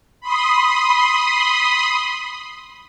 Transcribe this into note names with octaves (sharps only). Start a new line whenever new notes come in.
B5 C6 D#6